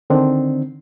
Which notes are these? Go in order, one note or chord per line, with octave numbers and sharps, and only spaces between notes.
D3 D#3 C4 D4